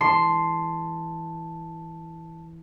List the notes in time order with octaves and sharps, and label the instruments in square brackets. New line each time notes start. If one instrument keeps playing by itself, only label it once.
[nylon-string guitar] E3 G#3 [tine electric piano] A5 [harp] C6